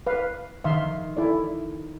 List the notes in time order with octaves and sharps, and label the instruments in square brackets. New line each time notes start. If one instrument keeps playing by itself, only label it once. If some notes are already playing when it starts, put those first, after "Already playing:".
[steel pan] B4 F5
[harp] D#3 [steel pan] E5 F5 C6
[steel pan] E4 A4 D5